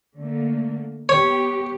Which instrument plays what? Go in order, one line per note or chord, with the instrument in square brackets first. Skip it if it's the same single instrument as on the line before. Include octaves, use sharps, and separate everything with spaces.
[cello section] D3 A3 A#3
[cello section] B3 G4 [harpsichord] C#5